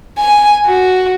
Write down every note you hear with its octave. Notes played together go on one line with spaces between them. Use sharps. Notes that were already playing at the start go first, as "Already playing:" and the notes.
G#5
F#4